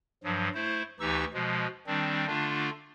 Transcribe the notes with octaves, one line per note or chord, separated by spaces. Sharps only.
G2 F3 F#3
A3 E4 C5
D2 E3 D#4 G4 C#6 E6
B2 F3 G#3
D#3 G3 C4 D4
D3 A3 D4 F4